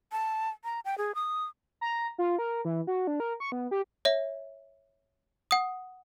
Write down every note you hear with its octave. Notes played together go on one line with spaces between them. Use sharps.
A5
A#5
G5
G#4
D#6
A#5
F4
A#4
E3
F#4
D4
A#4
C#6
B3
G4
C#5 E5
F#5 D#6